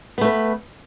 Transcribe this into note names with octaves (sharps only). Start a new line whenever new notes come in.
A3 B3 B4